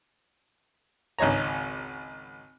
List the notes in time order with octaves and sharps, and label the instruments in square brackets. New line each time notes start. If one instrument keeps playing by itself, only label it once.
[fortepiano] G#1 C#2 D#4 C#5 A#5